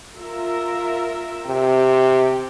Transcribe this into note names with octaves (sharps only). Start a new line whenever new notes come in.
F4 A#4 E5
C3 G5